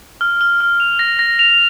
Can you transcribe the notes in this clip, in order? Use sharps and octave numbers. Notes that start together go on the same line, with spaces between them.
F6
F6
F6
F7
A#6
A#6
F7